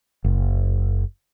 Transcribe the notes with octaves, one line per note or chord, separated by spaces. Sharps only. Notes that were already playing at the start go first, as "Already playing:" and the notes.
F#1